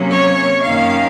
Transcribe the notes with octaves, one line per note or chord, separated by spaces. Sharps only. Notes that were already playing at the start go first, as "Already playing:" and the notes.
Already playing: C3 F#3 A#3 C#4
C#5
F#2 D#3 A#3 C#4 F5